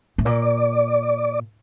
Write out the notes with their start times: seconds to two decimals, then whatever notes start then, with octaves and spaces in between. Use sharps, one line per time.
0.18 A2
0.25 A#2 D5